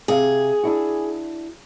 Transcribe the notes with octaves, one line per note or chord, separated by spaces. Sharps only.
C3 G#4 F5
D4 E4 F#4